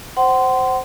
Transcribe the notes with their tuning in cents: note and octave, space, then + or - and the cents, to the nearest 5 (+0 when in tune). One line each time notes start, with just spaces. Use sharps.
C5 +0 F#5 +35 C6 -15